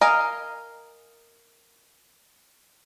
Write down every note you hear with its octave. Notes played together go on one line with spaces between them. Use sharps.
A#4 D#5 F5 G#5